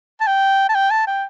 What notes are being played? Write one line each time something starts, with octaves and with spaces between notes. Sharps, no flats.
A5
G5
A5
G5
A5
G5